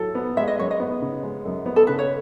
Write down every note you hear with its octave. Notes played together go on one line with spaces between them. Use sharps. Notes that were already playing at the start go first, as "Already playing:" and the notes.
Already playing: F#3 E4 A4
B3
G#3 E5
D#5
F#2 C#5
D#5
B3
C#3
G#3
F#2
B3
A4
C#3 B4
C#5